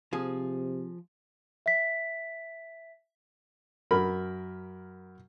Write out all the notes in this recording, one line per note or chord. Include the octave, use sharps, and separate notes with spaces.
C3 F3 G#4
E5 B6
F#2 A#4 B5